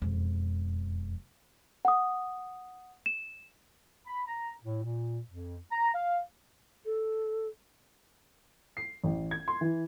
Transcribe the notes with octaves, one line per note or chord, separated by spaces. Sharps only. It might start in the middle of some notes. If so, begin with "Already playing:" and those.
E1 F2
F#5 D#6
E7
B5
A#5
A2
A#2
F2
A#5
F5
A4
C7
A1
G#6
C6
E3